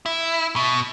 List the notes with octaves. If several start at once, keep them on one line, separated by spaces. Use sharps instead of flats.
E4
B2